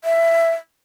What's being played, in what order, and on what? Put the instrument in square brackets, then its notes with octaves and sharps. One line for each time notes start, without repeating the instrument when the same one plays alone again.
[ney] E5